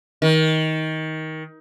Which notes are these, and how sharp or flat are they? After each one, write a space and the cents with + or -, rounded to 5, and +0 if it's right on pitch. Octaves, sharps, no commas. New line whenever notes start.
D#3 +20